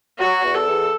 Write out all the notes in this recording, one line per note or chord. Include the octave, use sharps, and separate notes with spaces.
F#3 F#4
E2
A4
E2